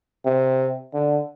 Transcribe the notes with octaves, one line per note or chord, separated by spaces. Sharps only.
C3
D3